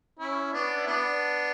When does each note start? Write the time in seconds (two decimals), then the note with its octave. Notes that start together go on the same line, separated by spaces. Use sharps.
0.19 C#4 E4
0.53 B3 D4
0.77 E4
0.87 B3 D4